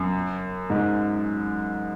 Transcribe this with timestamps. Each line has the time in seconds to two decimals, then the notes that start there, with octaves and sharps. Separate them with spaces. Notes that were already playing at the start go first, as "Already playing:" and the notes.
Already playing: F#2
0.70 G#2